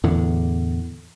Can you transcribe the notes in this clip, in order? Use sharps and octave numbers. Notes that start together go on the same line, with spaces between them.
E2 A2 D3